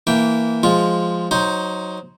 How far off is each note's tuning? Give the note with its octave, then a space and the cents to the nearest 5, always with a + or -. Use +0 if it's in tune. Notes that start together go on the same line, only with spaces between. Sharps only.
E3 +0 A#3 -10 G5 +0
F3 +0 G#3 +0 F4 +0
F#3 +0 D#4 +15 C5 +0